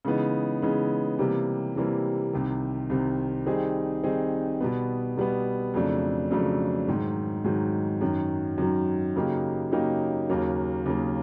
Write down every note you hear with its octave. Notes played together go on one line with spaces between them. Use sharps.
C#3 E3 G#3 B3 D#4
C#3 E3 G#3 B3 D#4
C3 E3 G3 A#3
C3 E3 G3 A#3
C2 C3 D#3
C2 C3 D#3
D#3 G3 C4 D#4 G#4
D#3 G3 C4 D#4 G#4
B2 G3 B3
B2 G3 B3
F2 C#3 F#3 A3 D4
F2 C#3 F#3 A3 D4
G#2 D#3 F#3
G#2 D#3 F#3
F#2 D#3 F#3
F#2 D#3 F#3
C#3 F#3 A#3 D#4 G4
C#3 F#3 A#3 D#4 G4
D#2 C#3 F#3 A#3
D#2 C#3 F#3 A#3